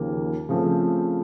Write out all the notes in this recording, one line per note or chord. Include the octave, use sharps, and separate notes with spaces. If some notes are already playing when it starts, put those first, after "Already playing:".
Already playing: D#2 C#3 F3 A#3
C#3 F3 A3 C4